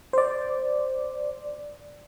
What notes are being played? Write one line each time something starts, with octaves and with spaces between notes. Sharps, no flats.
C5 D5